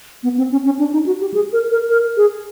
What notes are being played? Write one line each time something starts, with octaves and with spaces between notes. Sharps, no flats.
B3
C4
C#4
C#4
D4
D#4
F#4
G4
G#4
A#4
A#4
A#4
G#4